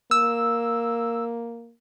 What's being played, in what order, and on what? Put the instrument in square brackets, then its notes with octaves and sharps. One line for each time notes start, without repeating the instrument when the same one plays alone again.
[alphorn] A#3 [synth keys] E6